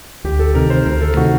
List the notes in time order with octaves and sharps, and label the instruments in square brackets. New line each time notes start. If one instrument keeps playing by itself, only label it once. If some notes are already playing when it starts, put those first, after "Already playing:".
[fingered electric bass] D2 [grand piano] G4
[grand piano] A4
[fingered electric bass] C3 D#3 [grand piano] A#4
[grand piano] C5
[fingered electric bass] D2 [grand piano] A#4
[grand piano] A4
[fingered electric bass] C3 D#3 [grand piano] F#4